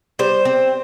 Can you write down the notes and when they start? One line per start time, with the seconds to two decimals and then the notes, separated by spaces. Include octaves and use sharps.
0.19 G3 C5
0.45 C4